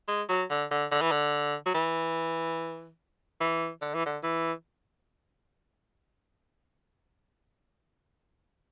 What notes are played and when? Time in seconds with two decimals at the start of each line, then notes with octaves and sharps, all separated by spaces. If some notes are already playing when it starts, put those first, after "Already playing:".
0.08 G#3
0.29 F#3
0.50 D3
0.71 D3
0.92 D3
1.01 E3
1.11 D3
1.66 F#3
1.74 E3
3.40 E3
3.82 D3
3.94 E3
4.06 D3
4.23 E3